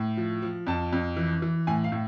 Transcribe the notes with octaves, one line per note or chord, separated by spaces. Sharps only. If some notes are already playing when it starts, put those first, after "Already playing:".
Already playing: A2
F3
F3
F2 A5
F2
E3
E3
A2 G#5
F5
A2